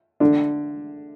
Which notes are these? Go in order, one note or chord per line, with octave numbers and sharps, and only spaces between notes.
D3 D4